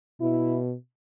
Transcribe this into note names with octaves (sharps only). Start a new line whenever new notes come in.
B2 E4